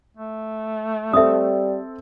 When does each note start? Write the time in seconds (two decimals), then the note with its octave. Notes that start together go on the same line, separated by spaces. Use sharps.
0.17 A3
1.13 G3 C4 A4 E5 D#6